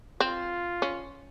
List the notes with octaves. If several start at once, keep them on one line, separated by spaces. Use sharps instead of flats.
C4 F4
C#4